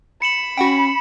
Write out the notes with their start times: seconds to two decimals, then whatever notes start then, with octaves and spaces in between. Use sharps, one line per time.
0.22 B5 C#7 E7 F#7
0.57 C#4 F#4 F#5 G5